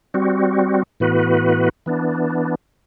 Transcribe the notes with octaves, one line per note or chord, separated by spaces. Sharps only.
G3 C4 F#4
A2 E3 B3 F#4 B4
E3 B3 D4